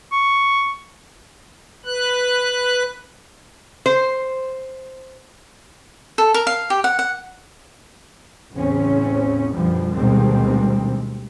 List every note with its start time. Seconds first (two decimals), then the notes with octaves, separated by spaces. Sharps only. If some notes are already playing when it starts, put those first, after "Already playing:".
0.12 C#6
1.85 B4 F#6
3.86 C5
6.18 A4
6.34 A#4
6.47 F5
6.70 G4
6.84 F#5
6.99 F#5
8.56 A1 E2 A2 C#3 C4 C#4
9.54 F#2 B2 D3 F3 G3
9.94 D2 B2 D#3 G3 G#3 C4